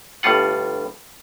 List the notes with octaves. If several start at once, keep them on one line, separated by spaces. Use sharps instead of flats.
G1 A2 G3 F4 F#5